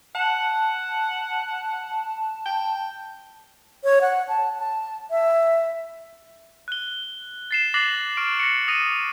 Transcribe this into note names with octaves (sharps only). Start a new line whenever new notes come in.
F#5 A5
G5
C#5
F#5
A5
A5
E5
F#6 G7
A6 C7 E7
D6 F#6 A6 A#6 C7 F#7
C#6 F6 D7
A#6 C#7
D#6 A#6 D#7 E7